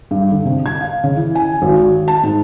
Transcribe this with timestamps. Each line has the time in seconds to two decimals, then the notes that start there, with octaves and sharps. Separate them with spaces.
0.11 G2
0.31 D3
0.45 C3
0.66 G#6
0.81 F5
1.04 C#3
1.16 E3
1.35 G#5
1.62 G#1
1.76 F#4
2.08 A5
2.23 G#2